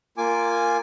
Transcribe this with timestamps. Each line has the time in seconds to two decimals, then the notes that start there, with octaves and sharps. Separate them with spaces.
0.18 A#3 F4 G#5 D6